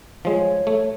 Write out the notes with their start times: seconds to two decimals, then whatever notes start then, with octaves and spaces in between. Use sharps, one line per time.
0.25 F3 G#3 C#5
0.67 A3